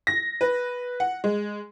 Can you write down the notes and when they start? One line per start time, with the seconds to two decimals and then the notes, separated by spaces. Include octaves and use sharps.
0.07 A#6
0.41 B4
1.00 F#5
1.24 G#3